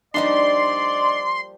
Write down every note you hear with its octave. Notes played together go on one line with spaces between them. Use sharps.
F3 G3 A#3 D4 D#4 D5 C6